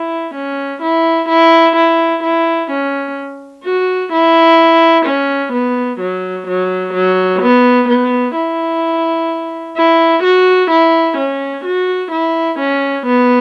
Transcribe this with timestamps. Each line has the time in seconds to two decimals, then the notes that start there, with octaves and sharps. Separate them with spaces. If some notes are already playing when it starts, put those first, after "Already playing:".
Already playing: E4
0.35 C#4
0.82 E4
1.29 E4
1.76 E4
2.23 E4
2.71 C#4
3.65 F#4
4.13 E4
5.06 C#4
5.53 B3
6.00 F#3
6.47 F#3
6.94 F#3
7.42 B3
7.89 B3
8.36 E4
9.77 E4
10.23 F#4
10.71 E4
11.17 C#4
11.64 F#4
12.12 E4
12.59 C#4
13.07 B3